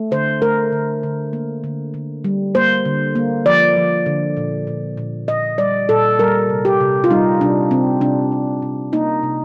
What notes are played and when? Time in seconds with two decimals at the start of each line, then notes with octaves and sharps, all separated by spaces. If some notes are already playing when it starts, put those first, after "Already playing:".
Already playing: A3
0.11 D3 C5
0.42 A3 A#4
0.72 D3
1.03 D3
1.33 A#3
1.64 D3
1.94 D3
2.24 G3
2.55 A#3 C5
2.85 D3
3.15 A#3
3.46 F3 D5
3.76 F3
4.06 D3
4.37 A#2
4.67 A#2
4.97 A#2
5.28 A#2 D#5
5.58 G3 D5
5.89 A#2 A4
6.19 G3 A#4
6.49 C3
6.65 G4
6.80 C3
7.04 F4
7.10 G3 D#4
7.41 C3 D4
7.71 C3 C4
8.01 C3 D4
8.32 C3
8.62 C3
8.93 A#3 D#4
9.23 C3